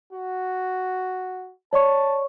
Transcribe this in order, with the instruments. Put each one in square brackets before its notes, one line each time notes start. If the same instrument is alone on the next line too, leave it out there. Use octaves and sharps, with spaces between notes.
[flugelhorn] F#4
[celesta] C#5 D5 C#6 [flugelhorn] A5